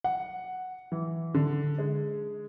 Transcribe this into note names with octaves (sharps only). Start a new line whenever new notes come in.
F#5
E3
D3
G#3